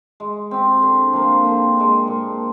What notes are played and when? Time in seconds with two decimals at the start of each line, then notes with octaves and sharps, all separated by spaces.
0.20 G#3
0.51 C4 G4
0.82 D3
1.13 F3 A#3
1.45 D3
1.76 G#3 D4
2.07 A#2